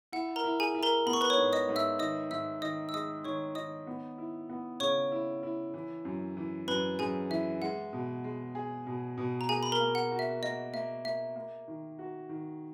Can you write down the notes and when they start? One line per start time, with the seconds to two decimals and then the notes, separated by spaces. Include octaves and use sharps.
0.13 E4 F#5
0.36 A#4 A#5
0.44 E4
0.60 G#4 G#5
0.75 E4
0.83 A#4 A#5
1.06 B3 B5
1.13 C#6
1.21 B4 B5
1.30 C#5 C#6
1.37 G#2
1.53 D#5 D#6
1.69 G#2
1.76 E5 E6
1.99 D#3 D#5 D#6
2.31 G#2 E5 E6
2.62 D#3 D#5 D#6
2.89 E6
2.94 G#3 D#5 D#6
3.25 D#3 C#5 C#6
3.55 D#3 D#5 D#6
3.87 B3
4.18 E4
4.50 B3
4.80 C#3 C#5 C#6
5.12 E4
5.43 E4
5.74 E3
6.05 F#2
6.37 E3
6.68 F#2 B4 B5
6.99 F#2 G#4 G#5
7.30 E3 E5
7.62 G#3 F#5
7.93 B2
8.24 G#3
8.55 G#4
8.87 B2
9.18 B2
9.41 A#5
9.49 A#3 G#4 G#5
9.63 B5
9.72 A#4 A#5
9.80 A#3
9.95 F#5
10.12 F#4
10.19 E5
10.42 A#3 D#5
10.73 A#3 E5
11.05 A#3 E5
11.36 A#3
11.68 D#3
11.99 F#4
12.29 D#3